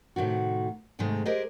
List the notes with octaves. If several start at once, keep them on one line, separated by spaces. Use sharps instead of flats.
A2 C3 D#3 F#4
G#2 C3 D#3 G#3 A3
G#3 G4 G#4 A#4 C5 D#5